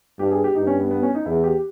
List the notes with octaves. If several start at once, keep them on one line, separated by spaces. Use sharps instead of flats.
G2 G4
G#4
G4
G2 D#4
C#4
B3
B3
C#4
D#4
E2 E4
G4